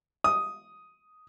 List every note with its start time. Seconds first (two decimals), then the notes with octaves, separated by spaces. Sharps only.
0.24 D#6